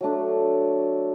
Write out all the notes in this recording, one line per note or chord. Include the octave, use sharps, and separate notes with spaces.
F#3 A3 D4